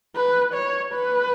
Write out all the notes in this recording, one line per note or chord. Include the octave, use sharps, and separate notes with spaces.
B4
C#5
B4